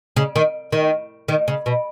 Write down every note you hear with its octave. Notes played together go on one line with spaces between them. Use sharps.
C#3
D#3
D#3
D#3
C#3
B2